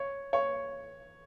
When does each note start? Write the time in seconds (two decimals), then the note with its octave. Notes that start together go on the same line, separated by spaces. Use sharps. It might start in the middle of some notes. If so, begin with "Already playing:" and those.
Already playing: C#5
0.33 C#5